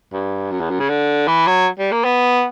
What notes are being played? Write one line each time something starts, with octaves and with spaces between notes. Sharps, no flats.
G2
F#2
E2
F#2
C#3
D3
E3
F#3
G3
A#3
B3